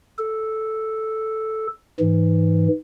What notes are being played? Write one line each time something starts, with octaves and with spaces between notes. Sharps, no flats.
A4
G#2 E3